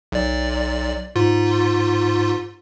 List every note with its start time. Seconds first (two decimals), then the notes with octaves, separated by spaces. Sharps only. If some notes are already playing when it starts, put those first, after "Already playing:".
0.12 B1 D5
1.16 G#2 F4